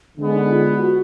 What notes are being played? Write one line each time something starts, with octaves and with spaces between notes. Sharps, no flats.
D3 G#3 B3 D4
D#4
F4
F4
F#4